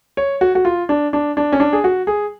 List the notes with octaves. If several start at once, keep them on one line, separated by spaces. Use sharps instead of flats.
C#5
F#4
F#4
F4
D4
D4
D4
C#4
D4
G#4
F#4
G#4